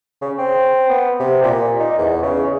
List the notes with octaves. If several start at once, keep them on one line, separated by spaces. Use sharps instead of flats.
C#3
C4
B3
C3
A#2
D#4
E2
C#3